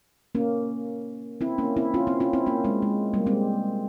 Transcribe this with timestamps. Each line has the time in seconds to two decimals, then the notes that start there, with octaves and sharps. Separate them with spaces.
0.35 A#3 C#4
1.41 C4 E4
1.58 A#3 C#4
1.77 C4 E4
1.94 C#4 F4
2.07 C4 E4
2.20 C#4 F4
2.33 C4 E4
2.46 A#3 C#4
2.64 G#3 C4
2.82 G#3
3.14 G3 A#3
3.26 G#3 C4